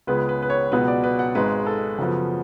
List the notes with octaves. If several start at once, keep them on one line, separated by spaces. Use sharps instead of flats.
C#2 C#3 G#3 B3 B4
B4
B4
C#5
C#2 B2 F#3 B3 B4
D5
B4
F#5
G#1 G#2 G#3 B4
A4
F#2 C#3 F3 B3